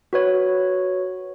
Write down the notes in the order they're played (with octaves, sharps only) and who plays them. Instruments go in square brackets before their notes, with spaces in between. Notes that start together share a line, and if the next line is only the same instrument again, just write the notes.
[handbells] F#4 B4 C#5